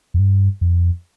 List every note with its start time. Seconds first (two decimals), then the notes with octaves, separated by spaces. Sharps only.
0.14 F2
0.19 G2
0.61 F2